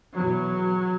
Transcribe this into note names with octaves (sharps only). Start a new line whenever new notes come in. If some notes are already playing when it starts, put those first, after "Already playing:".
E2 B2 F#3